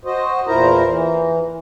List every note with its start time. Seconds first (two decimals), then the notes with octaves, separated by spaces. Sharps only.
0.05 F#4 C5 D#5
0.48 E2 A#2 E4 A#4 C5 A#5
0.86 E3